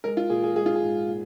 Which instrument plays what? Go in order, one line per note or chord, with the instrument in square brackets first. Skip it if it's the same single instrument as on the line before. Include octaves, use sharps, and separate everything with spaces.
[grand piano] G#3 A#4
F4
A#2 G#4
G#4
G#3 G#4
F4
G#4
G#2
A#2